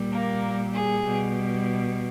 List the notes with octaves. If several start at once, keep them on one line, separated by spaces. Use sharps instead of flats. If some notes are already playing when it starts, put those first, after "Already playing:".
Already playing: A#2 G3
A#3 A#4
G#4
B2 G3